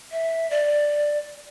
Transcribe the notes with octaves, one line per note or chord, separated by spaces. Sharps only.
E5
D5